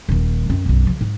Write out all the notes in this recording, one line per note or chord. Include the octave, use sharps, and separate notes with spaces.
D#1 D#3
F#2 C4
B1 F#2
C#3 F3
G#2